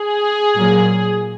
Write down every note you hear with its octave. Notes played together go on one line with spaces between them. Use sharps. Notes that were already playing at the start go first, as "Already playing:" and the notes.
Already playing: G#4
A#2 F#3 A#3